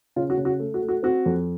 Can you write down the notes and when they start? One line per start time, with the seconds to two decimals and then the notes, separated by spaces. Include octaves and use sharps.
0.16 C#3 F4
0.30 F#4
0.37 C#3
0.45 F#4
0.59 A3
0.74 F#4
0.82 A3
0.89 F#4
1.03 C4 F#4
1.26 F2